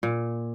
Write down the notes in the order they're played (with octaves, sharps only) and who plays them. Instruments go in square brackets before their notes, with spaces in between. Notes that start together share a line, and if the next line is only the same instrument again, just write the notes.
[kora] A#2